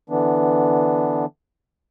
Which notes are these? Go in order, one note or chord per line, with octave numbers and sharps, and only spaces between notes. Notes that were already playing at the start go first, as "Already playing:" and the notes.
D3 E3 B3 D4